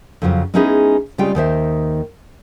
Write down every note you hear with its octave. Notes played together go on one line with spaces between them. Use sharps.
F2 C#3 F#3 F4 C5
G#3 B3 C#4 D#4 E4 G#4
C#3 G3 G#3 C4 F4 G5
D#2 D#3 C5 E5